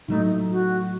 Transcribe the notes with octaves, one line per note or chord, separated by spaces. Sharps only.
A2 F#3 A3 D#4
F#4